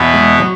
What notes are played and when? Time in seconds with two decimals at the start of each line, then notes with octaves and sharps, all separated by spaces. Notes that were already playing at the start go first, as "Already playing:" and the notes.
Already playing: E2 B2 B3
0.14 G#3
0.40 F#3